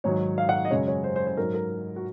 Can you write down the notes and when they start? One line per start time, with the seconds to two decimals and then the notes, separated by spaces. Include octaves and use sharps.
0.04 G#2 D#3 F#3 C#5
0.38 F5
0.49 F#5
0.65 D#5
0.71 F#2 C#3 G#3 C#5
0.88 C#5
1.04 C5
1.16 C5
1.27 C5
1.37 G#2 F#3 A#4
1.54 A#4
1.96 F#4